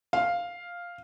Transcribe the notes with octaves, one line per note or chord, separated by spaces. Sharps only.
F5